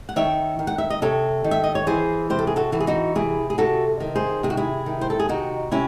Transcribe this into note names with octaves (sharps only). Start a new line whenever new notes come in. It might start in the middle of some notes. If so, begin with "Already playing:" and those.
F#5
D#3 C#5 E5
D#3
F#5
E5
D#5
C3 A4 C#5
D#3
E5
D#5
C#5
E3 G#4 C5
C3 C5
A4
G#4
F#4 A4
E3 F#4
G#4
D#4 F#4
C3 E4 G#4
G#4
C3 F#4 A4
D#3
G#4 C5
C3 G#4
F#4
E4 G#4
D#3
C5
A4
G#4
C3 D#4 F#4
C3 C#4 E4